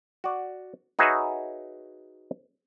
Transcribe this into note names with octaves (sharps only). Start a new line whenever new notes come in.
F#4 D5
D#4 F#4 G#4 B4 C#5 E5